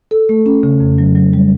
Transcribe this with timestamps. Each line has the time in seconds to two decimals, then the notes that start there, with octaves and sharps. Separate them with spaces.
0.11 A4
0.29 A3
0.46 C#4
0.63 C#3
0.80 F2
0.98 F#3
1.15 F#3
1.33 G3